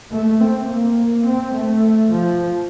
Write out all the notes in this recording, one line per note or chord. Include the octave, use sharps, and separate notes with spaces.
A3
C4
A#3
C4
A3
F3